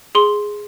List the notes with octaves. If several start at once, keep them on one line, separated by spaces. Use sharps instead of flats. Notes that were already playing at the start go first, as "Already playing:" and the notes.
G#4 C6